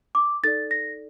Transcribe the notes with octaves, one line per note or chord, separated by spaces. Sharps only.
D6
D#4 A4 D5 A6
A#6